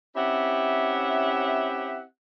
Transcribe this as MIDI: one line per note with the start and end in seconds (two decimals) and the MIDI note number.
0.16 2.02 60
0.16 2.02 61
0.16 2.02 64
0.16 2.02 67
0.16 2.02 76
0.16 2.02 78